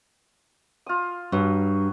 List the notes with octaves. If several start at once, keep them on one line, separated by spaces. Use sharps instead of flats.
F4 D#6
G2 F#3